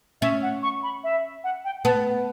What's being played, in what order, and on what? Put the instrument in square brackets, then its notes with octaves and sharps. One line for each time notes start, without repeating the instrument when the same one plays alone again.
[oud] C#4 [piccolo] E5
[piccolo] F#5
C#6
B5
E5
F#5
G5
[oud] B3 [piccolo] A5